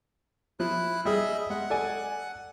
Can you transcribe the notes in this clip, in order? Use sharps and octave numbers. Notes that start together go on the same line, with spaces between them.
F3 E4 F#6
G3 G#4 D#5 E5
G#3 F#5
A4 D5 G#5